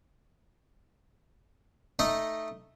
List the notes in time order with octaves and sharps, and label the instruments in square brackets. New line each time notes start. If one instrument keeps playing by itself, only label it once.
[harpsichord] A3 D#4 D#5